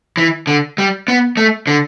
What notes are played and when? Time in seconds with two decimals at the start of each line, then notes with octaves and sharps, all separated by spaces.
0.17 E3
0.47 D3
0.78 G3
1.08 B3
1.37 A3
1.67 D3